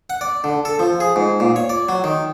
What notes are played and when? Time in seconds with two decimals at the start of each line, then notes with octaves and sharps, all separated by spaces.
0.10 F#5
0.21 D5
0.44 D3
0.65 A4
0.79 F3
1.00 G#4
1.16 G#2
1.40 A#2
1.56 C#5
1.70 D5
1.89 F#3
2.04 D#3